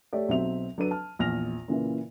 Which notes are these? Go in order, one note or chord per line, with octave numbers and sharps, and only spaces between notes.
A3 G4 C#5 D5
B1 F#3 C4 F#4 E5 F7
F#3 D4 A4 B4 D#7
A5 F6
A#1 E2 F6 A#6 F7
A#2 C#3 E3 A#3 E4